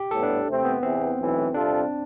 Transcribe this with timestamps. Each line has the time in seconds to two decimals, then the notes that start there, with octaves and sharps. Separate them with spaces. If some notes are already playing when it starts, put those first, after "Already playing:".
Already playing: G4
0.11 A2 G3 B3 A4
0.23 D4
0.47 C3 E3 A3 C4
0.65 B3
0.83 E2 C3 E3 C4
1.18 B1 A2 E3
1.54 C3 G3 C4 D4 F4 A4